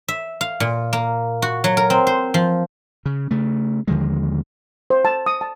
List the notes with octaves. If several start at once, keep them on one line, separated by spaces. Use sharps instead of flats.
E5
F5
A#2
A#3
F#4
F#3
A#4
C4
C5
F3
C#3
C#3 A3
D#2 D3 F3 G#3
C5
A5
D#6
A5